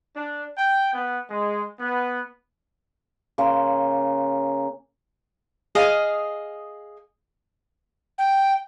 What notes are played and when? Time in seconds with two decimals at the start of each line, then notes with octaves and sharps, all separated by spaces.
0.17 D4
0.58 G5
0.94 B3
1.31 G#3
1.80 B3
3.38 C#3 A#3 C6
5.75 G#4 D#5 F5
8.18 G5